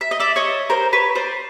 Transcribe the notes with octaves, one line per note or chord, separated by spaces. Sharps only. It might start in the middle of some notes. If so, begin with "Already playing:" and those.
E5
D#5
D5 E5
C#5 D#5
A#4 C5
B4 C#5
C5 D5